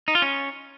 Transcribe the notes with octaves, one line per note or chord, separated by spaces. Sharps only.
D#4
F4
C#4